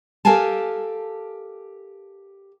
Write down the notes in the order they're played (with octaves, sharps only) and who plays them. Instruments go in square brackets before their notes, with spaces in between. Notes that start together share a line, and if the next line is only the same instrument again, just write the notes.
[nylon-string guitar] G4 A4 A#4 F5 G#5 A5